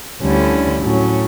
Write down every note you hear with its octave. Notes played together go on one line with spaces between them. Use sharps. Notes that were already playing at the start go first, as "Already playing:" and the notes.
D2 D3 G3 C#4 E4
A2 F#3 C#4